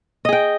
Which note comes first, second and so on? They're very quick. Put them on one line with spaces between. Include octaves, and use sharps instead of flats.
D#5 G#4 G5